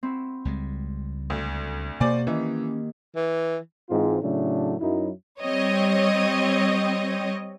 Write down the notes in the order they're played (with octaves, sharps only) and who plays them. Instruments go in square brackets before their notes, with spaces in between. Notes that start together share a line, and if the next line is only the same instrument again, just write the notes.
[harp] C4 E4 F#4
[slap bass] C#2 G3 G#3
[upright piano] D2
[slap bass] B2 [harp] A#3 F#4 G4 [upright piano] C5 D5 G#5
[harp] D#3 [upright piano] E3 [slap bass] C#4
[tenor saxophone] E3
[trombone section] G#2 E3 G#3 C4 F4
A2 C#3 F#3 A3 D4
F#2 F#3 D#4 E4
[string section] G3 C4 C#5 D#5